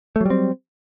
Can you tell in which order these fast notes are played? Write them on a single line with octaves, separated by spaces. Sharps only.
A3 F#3 G3 C4